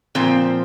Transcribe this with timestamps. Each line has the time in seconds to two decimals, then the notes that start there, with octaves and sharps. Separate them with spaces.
0.15 A#2 F3 C4